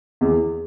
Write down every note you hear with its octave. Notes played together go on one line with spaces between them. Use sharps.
E2